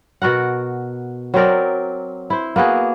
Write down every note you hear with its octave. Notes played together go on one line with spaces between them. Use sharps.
B2 F#4 A#4 F#5
F#3 C4 A#4 D5
E4 C5
A#3 B3 F#4 G#4